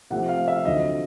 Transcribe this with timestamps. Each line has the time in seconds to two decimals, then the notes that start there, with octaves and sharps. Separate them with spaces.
0.10 C3 F3 A3 F#5
0.29 F5
0.48 E5
0.65 F2 D3 F#3 D#5